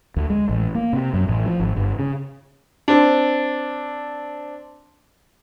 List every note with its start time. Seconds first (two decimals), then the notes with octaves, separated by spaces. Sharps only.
0.16 D2
0.30 G#3
0.49 A1
0.75 A#3
0.93 C3
1.14 F#2
1.28 A1
1.46 F3
1.60 G#1
1.76 G1
1.99 C#3
2.88 C4 D4